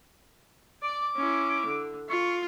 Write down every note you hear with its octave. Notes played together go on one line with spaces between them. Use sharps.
D5 D6
C#4 E4
D3
F4 C#6